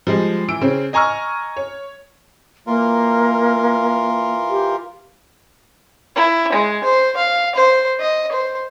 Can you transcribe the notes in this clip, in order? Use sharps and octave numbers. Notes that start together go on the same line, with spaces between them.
F3 G3 G#3
E3 E6 D7
C#3 C4 C#4
D#5 G#5 A#5 C#6 E6 F6
C#5
E3 A#3 F4 A#4
G4
E4
G#3
C5
F5
C5
D#5
C5